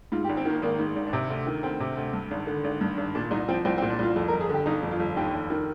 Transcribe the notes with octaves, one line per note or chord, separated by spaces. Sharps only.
G#2 F4
G4
G#1
C4
D#3 A#3
G#1 A#3
G#2
G#1
D4
C3 C4
D2
D#3
D2 C4
C3
D2
G2
G#1
D3
G#1
G2
G#1
A#2 D4
C2 D#4
F3 C4
C2 C4
C4
A#2
D4
C2 F4
F2
A#4
G1
G#4
D3 G4
G1 D#4
F2
F4
G1
D#2 G4
F1
D#3